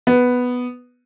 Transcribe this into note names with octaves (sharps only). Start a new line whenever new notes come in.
B3